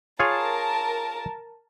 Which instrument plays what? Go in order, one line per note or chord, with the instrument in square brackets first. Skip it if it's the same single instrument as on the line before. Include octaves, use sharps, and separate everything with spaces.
[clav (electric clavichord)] F4 G#4 C#5 [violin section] A#4 A5